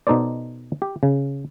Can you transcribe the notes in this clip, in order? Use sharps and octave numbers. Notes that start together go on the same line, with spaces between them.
B2 D#4 A4 C5 D5
G4
C#3